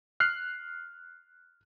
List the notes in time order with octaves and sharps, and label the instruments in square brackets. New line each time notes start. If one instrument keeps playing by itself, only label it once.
[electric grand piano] F6 F#6 C7